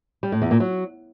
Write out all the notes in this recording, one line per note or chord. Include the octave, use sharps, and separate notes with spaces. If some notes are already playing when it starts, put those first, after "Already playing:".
G3
A2
E2
A#2
F#3